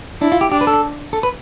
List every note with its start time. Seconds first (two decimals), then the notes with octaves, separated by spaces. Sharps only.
0.22 D4 E4
0.32 F4
0.41 G4
0.52 D4 G4
0.61 B4
0.67 A4
1.13 A4
1.23 B4